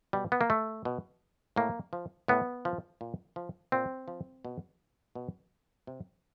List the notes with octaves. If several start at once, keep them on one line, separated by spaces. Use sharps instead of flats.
B2 G3
B3
A#3
A3
B2
A2 A#3
F3
A2 B3
F3
A#2
F3
A#2 C4
F3
B2
B2
C3